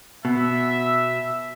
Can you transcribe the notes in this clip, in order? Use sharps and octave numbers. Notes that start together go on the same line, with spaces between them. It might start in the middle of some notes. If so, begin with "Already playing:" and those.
B2 E5